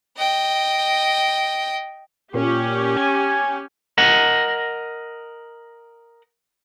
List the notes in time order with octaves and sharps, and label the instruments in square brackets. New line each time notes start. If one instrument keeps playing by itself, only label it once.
[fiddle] D#5 G5
[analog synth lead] A#2 [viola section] C#4 G4
[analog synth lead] G#5
[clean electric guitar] A#4 D#5 F#5